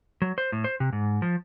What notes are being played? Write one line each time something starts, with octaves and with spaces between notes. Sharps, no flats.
F#3
C5
A2
C5
C3
G#2
F3